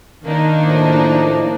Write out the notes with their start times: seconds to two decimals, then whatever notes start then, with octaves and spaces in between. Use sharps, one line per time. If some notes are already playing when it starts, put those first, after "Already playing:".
0.25 D#3 A#3 D4 D#4
0.62 A2 F3 D5